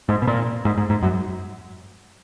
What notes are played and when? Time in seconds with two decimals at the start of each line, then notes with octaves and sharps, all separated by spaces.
0.09 G#2
0.22 B2
0.27 A#2
0.65 G#2
0.77 G#2
0.90 G#2
1.02 F#2